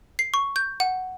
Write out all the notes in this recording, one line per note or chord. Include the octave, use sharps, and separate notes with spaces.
C7
C#6
G6
F#5